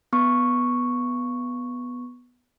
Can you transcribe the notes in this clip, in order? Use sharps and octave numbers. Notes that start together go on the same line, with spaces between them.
B3 C#6